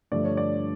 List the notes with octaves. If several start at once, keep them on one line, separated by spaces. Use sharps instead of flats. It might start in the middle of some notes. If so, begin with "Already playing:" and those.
G2 D3 F3 A3 D5
C#5
D5